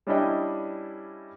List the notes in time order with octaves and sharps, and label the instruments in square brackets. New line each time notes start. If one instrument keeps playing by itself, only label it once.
[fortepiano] G3 C#4 D4 E4 D#5 G5